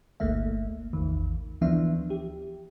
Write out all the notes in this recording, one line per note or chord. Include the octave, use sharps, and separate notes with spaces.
G1 D2 A3 A#3 E5
A1 E2 D#3
D2 E3 F3 B3 D4 E5
G4